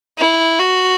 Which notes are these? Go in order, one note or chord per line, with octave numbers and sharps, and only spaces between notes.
E4
F#4